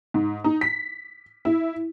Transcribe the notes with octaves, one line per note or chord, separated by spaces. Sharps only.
G#2
D#4
B6
E4